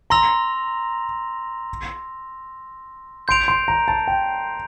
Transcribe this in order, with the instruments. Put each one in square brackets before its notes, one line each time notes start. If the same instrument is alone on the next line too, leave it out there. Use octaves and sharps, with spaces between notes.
[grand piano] A#5 [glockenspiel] C6 E6 A#6 F7
[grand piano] C6 [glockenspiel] G6 D7 F7
[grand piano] C6
A#5
A5
G5